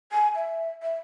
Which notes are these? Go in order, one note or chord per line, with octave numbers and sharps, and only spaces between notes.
G#5
E5
E5